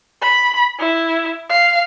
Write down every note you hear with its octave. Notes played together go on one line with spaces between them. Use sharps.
B5
E4
F5